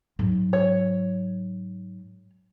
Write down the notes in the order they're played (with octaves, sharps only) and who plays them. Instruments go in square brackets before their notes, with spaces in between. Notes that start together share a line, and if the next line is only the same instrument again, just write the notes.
[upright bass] G#2 F#3
[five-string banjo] C#5